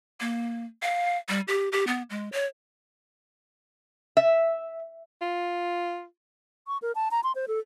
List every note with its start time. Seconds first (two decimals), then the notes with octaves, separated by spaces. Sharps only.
0.20 A#3
0.82 F5
1.29 G3
1.48 G4
1.72 G4
1.87 B3
2.10 G#3
2.32 C#5
4.17 E5
5.22 F4
6.67 C#6
6.82 A#4
6.95 A5
7.11 A#5
7.24 C6
7.35 C5
7.48 A4